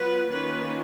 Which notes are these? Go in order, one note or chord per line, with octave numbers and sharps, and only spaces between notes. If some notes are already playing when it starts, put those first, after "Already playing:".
Already playing: F#3 B3 F4 B4
D#3 A#3 C#4 F4 B4